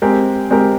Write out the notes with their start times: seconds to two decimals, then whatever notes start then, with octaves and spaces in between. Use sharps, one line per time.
0.02 G#3 C4 G4 A#4
0.50 G#3 C4 G4 A#4